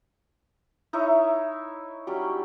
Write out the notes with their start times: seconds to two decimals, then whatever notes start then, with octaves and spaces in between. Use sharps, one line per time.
0.93 D#4 E4 C#5 E5
2.07 F#3 G3 C#4 G4